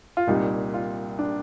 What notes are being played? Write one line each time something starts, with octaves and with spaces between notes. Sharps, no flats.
F4
C2 A#2 G3 D#4
F4
D4